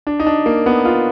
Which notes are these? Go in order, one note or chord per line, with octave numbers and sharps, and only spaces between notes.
D4
D#4
D4
A#3
B3
F4